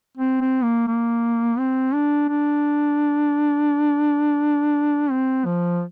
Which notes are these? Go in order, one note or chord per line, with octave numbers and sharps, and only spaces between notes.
C4
C4
A#3
A#3
C4
D4
D4
C4
F3